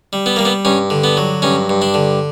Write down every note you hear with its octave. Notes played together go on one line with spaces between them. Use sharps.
G3
B3
G3 A#3
B3
G2 C#4
D3
B3
F#3
G2 C#4
G2
D4
D3